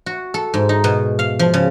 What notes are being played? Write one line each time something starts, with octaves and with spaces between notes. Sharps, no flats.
F#4
A4
G#2
D#4
B2
F5
F3
C#3